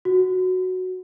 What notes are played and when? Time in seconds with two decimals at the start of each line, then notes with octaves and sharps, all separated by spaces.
0.05 F#4